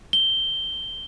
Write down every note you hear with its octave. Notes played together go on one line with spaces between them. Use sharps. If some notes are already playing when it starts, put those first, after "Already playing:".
G7